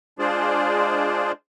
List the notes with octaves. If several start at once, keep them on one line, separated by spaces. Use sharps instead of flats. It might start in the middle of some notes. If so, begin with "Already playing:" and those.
G#3 D4 F4 G#4 C5 D5